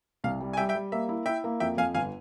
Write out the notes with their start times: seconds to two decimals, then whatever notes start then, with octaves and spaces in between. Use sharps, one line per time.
0.24 C2 F5
0.41 G3
0.53 G#5
0.57 G3 E5 G5
0.69 E5 G5
0.75 G3
0.92 A#3 E5
1.09 E4
1.26 E4 E5 G5
1.44 A#3
1.60 F2 E5 G5
1.77 F2 F5 G#5
1.94 G1 F5 G#5